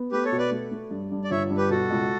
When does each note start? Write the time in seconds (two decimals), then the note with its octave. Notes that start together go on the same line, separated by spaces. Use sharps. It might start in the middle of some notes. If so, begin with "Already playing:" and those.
Already playing: B3
0.12 A3 G4 B4
0.25 A4 C#5
0.32 B2
0.38 B4 D5
0.51 A3
0.71 A3
0.91 G2
1.12 G2
1.24 D5
1.31 G1 C#5 E5
1.50 G2
1.57 G4 B4
1.70 B2 F#4 A4
1.90 C#2